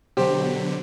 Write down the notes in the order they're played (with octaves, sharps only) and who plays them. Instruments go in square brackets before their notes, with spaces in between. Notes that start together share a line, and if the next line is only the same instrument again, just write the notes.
[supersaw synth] B2 D3 F#3 [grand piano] G4 C5